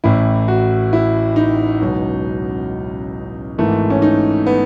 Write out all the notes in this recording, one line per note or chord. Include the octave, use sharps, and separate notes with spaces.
A1 A2 E3 E4
F#4
E4
D#4
C#2 B2 F#3
G#1 G#2 E3 A3
C#4
D#4
B3